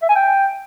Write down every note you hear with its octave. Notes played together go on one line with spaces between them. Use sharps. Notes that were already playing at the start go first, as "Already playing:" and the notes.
E5
G#5
G5